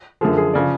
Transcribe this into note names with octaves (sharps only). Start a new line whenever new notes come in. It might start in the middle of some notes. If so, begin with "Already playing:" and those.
F#2 D3 F3 G#4
G#4
C#3 F3 D5